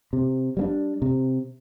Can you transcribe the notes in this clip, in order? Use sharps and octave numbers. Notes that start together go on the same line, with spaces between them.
C3
G3 A#3 D4
C3